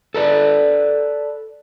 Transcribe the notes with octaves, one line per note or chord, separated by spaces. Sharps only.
A4 B4 D5